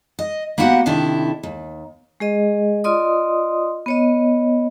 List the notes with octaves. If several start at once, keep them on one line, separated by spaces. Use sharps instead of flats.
D#5
A#3 B3 E4 F#4 G4 F#5
C3 D#3 D4 E4 A4
D#2
G#3 G#4 D#5
F4 D5 D#5 C6 D#6
B3 C#5 D#5